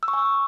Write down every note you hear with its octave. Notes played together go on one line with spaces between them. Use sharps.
E6
C#6
G#5